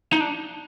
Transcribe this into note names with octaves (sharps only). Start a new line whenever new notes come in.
D#4
D4